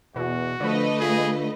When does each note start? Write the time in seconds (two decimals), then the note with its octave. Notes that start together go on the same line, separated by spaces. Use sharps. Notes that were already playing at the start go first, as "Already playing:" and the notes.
0.16 E2 B2 F#4
0.60 D3 F3 A3 B4 D#5
1.00 F4 G#4